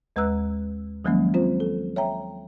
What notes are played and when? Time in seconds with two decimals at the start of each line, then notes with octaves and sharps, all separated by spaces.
0.16 D#2 G#3 B4 A#5 E6 F#6
1.05 D#3 F3 F#3 G#3 A#3 C#4
1.34 C4 F4 C5
1.60 A4
1.96 C#5 E5 G5 A#5